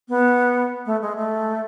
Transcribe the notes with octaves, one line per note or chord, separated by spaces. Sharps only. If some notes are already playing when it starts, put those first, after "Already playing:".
B3
A3
G#3
A3